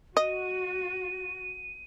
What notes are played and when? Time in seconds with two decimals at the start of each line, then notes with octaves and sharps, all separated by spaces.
0.17 F#4 D#5 D#7